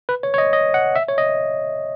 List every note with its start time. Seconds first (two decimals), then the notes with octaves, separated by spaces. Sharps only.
0.09 B4
0.23 C#5
0.34 C#5
0.38 D#5
0.53 D#5
0.74 F#5
0.96 E5
1.08 C#5
1.18 D#5